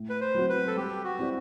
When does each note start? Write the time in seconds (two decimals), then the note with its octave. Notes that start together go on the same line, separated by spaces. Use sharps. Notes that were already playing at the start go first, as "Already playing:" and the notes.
Already playing: A2
0.10 B4
0.21 C5
0.35 F#3 C4 F#4
0.49 B4
0.67 A4
0.76 G3 G4
1.04 F#4
1.19 C4 E4 G4 D5